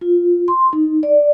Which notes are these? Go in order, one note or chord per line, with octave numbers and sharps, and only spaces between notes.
F4
C6
D#4
D5